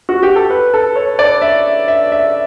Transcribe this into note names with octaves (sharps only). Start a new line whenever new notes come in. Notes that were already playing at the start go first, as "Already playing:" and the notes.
F#4
G4
A4
B4
A4
C#5
D5
E5
E5
E5